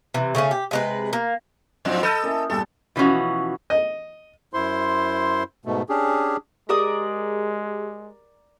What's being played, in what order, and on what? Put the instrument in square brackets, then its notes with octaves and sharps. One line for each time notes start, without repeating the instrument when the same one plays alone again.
[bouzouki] C3 E3
C#3 A3 C4 C#4
G4
C3 G#3 B4
A#3
[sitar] G#2 F3 C4 [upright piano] F#3 D4 D#4
[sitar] A4 D#5 [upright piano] B5 F6 G6
[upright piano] A#3 C#4 E4
[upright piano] E2 G2 A#2 [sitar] A4
[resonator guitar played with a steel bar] B2 E3 F3 C#4 F#4
[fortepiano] D#5
[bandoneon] F#2 E4 C5 C6
G#2 B2 A3
C#4 D4 G4 G#4
[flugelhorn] G#3 [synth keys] G4 G#4 [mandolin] A#4 D5 D#6